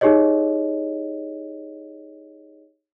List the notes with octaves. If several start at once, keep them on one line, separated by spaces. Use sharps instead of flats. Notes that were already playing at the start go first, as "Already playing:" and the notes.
D#4 G4 G#4 C#5 D#5